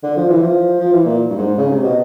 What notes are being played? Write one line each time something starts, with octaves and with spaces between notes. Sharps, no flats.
D3
F3
E3
F3
F3
E3
A#2
G2
G#2
C#3
C3
B2